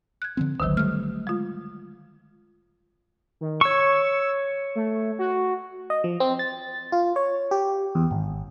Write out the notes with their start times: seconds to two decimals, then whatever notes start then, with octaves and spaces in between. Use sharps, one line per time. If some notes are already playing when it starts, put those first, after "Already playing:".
0.22 F#6 G#6
0.37 D3 F3 C4
0.60 G#1 D2 D3 D#3 F#3
0.77 G3 A3 F6
1.27 G#3 F4
3.41 D#3
3.61 C#5 C#6 E6
4.75 A3
5.19 F#4
5.90 D#5
6.04 F3
6.20 C4
6.39 A6
6.92 F4
7.16 C#5
7.51 G4
7.95 E2
8.11 G#1